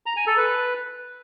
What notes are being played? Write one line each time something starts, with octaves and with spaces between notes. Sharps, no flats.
A#5
G#5
A4
B4